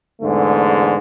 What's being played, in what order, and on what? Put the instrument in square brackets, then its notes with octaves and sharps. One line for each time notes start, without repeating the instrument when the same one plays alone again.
[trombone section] E2 G#2 D3 A3